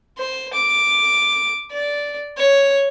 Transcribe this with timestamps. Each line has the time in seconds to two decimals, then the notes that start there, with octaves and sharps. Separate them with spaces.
0.18 C5
0.53 D6
1.71 D5
2.37 C#5